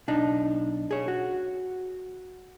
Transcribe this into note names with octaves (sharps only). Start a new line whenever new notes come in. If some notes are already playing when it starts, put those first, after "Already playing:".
B1 D4 D#4
G#4 C#5
F#4